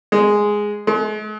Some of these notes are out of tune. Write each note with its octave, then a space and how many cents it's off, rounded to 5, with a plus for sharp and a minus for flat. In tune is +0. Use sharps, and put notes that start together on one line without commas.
G#3 +0
G#3 +45